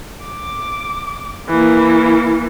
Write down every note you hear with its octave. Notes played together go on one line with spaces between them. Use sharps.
D6
E3 A#3